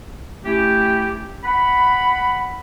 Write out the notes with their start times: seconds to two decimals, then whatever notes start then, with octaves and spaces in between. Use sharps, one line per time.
0.45 A3 C#4 E4 G4
1.44 F#5 B5